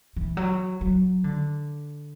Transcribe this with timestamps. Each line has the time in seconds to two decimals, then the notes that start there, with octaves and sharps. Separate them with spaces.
0.16 E3
0.37 F#3
0.81 F#3
1.24 D3